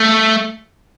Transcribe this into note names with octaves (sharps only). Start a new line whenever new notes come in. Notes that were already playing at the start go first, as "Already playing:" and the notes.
Already playing: A3